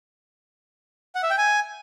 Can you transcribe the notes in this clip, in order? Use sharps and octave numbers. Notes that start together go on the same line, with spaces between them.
F#5
E5
G5
G#5